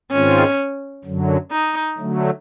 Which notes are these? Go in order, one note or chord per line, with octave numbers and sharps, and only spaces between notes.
G#2 D#3 G#3 C4 C#4 F4
F#2 D3 F#3
D#4
D3 F#3 A3